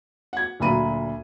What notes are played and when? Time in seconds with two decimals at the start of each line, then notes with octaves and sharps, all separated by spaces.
0.33 F#5 G#6
0.60 D2 A#2 F#3 A#5 B5 D#7